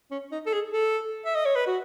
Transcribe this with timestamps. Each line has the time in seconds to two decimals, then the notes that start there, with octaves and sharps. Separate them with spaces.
0.11 C#4
0.32 D#4
0.46 A4
0.53 G#4
0.73 A4
1.25 E5
1.35 D#5
1.46 C#5
1.56 B4
1.67 F#4